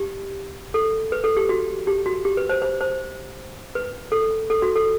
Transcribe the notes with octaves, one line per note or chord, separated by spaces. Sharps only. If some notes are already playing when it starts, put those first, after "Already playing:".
Already playing: G4
A4
B4
A4
G4
F#4
G4
F#4
G4
B4
C5
C5
C5
B4
A4
A4
F#4
A4